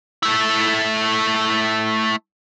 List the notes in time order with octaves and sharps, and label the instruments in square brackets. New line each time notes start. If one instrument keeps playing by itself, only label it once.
[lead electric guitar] A3 E4